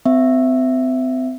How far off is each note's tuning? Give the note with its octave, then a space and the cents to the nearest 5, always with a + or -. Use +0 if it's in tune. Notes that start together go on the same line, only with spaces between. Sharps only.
C4 -35 E5 +5